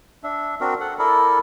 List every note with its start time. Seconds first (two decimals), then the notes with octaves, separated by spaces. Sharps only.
0.24 D4 E5
0.61 C4 D4 F#4 A#4
0.80 A4 F#5
0.99 E4 A4 A#4 D5